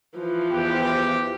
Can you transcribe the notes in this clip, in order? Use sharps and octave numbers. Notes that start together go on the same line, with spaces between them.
E3 F3
E2 G4